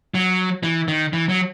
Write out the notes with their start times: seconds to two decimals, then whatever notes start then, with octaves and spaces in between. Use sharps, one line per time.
0.14 F#3
0.63 E3
0.88 D#3
1.13 E3
1.29 F#3